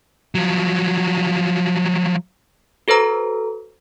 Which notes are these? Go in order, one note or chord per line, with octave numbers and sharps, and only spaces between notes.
F3 F#3
F#4 A4 B4 C5 A#5